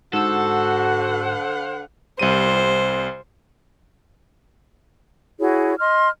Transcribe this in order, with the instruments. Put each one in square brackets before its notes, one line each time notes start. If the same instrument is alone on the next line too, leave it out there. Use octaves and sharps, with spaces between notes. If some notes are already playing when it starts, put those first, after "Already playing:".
[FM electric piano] G#2 E6 [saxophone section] D3 C5 F#5 [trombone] F#4 [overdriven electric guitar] A4
[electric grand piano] C2 G3 D#7 [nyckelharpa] C5
[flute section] E4 F#4 G#4 C#5
D#5 C6 F6